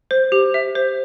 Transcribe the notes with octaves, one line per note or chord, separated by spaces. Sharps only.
C5
G4
E5
C5